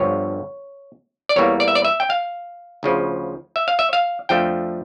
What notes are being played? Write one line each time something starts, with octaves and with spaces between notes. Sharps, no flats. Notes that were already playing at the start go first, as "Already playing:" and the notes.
Already playing: G1 G2 D3 F3 C#5
D5
E2 E3 G3 A#3 C#5
D5
E5
D5
E5
G5
F5
D2 C#3 F3
E5
F5
E5
F5
F2 D3 F3 A3 G5